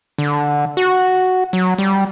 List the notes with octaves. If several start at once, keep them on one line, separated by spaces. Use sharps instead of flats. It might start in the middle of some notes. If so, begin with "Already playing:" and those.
D3
F#4
F#3
G3